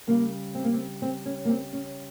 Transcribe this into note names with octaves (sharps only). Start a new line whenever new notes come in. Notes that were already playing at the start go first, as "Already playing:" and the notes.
C#3 G3 A#3
C4
A#3
C4
C4
C#4
A#3
C4
C#4